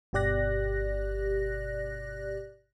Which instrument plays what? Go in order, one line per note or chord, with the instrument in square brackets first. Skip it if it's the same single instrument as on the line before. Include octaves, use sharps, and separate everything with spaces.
[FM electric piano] G1 B2 G4 D5 F#6 A#6